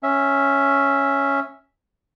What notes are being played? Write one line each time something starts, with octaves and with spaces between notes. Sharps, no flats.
C#4 E5